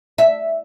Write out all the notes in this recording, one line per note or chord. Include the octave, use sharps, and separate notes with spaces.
E5